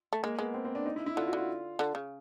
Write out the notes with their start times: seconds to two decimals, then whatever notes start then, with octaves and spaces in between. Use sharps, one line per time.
0.13 A3
0.23 G#3 A#3
0.39 G#3 B3
0.54 C4
0.65 C4
0.75 D4
0.86 D#4
0.96 E4
1.06 E4
1.16 D3 F4
1.27 F#4
1.33 D3 F4
1.79 D3
1.95 C#3